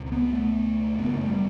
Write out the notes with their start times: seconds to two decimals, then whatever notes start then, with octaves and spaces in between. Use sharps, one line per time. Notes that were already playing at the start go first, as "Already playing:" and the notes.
Already playing: C#2 B2
0.12 B3
0.33 A3
0.98 F#2 C#3 B3
1.14 A3
1.28 G3